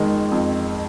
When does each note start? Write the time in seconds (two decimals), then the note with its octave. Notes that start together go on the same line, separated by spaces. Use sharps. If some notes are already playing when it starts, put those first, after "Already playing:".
Already playing: F2 D#3 G#3
0.32 F2